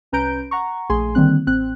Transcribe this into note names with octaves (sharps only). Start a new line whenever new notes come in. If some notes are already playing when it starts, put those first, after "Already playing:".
C2 C#4 B4 A#5 G6 D7
F#5 A#5 C#6
A#1 A3 G#4 G#5 C6
D3 D#3 G3 A#3 C4 F#6
A1 C4 F#6